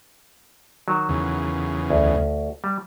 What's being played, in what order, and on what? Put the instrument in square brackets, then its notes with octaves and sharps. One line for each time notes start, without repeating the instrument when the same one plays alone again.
[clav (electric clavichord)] D#3 F#3
[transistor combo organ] E2 C#3
[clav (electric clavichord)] D2
G3